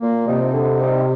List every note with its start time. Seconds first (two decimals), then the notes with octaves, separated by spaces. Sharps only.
0.02 A#2 A#3
0.27 C3 F3 C4 D#4
0.53 D3
0.78 G3 C4 D#4